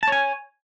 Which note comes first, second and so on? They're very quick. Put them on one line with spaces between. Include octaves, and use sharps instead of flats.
A5 C#5 G#5